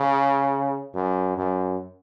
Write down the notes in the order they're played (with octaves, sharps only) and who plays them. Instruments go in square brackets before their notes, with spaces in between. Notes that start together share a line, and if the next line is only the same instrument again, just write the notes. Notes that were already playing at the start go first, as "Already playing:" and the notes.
Already playing: [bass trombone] C#3
F#2
F#2